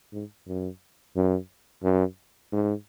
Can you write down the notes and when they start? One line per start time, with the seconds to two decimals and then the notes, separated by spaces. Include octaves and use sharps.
0.13 G#2
0.47 F#2
1.16 F#2
1.83 F#2
2.52 G#2